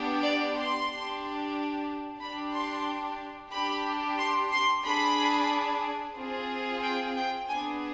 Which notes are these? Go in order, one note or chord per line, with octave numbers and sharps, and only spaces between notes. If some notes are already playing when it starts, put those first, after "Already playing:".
Already playing: B3 D4 G4
D5
C6
D4 G4
D4 G4 B5
C6
D4 G4 B5
C6
C6
D4 G#4 B5
C4 F4 G#4
G5
G5
B3 D4 G#4 G#5